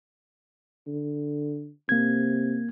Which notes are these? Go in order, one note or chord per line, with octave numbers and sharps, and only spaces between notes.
D3
C3 A#3 G#6